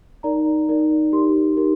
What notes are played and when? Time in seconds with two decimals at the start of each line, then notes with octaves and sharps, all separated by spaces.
0.23 D#4 A#4 D5 A#5
0.69 D#4 A#4 D5
1.12 D#4 G4 A#4 C6
1.57 D#4 G4 A#4